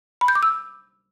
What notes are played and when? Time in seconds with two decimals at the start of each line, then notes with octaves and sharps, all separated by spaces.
0.21 B5
0.28 G6
0.35 D6
0.43 E6